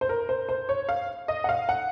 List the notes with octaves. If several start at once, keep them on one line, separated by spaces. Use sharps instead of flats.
C5
A#4
C5
C5
C#5
F5
D#5
F#5
F5
F#5